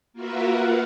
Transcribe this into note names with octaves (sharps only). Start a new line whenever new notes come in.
A#3 F4 F#4 A#4 B4 E5
F5 F#5